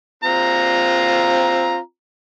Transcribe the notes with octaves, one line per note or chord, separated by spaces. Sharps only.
C4 F4 A#5